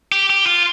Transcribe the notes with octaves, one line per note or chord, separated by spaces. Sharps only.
G4
G4
F4